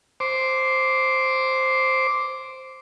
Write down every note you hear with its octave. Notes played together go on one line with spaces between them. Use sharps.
C5 D6